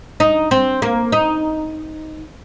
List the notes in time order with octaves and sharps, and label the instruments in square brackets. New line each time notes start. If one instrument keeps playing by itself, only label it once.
[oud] D#4
C4
A#3
D#4